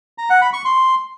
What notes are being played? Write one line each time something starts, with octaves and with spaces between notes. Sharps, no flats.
A#5
F#5
B5
C#6
C6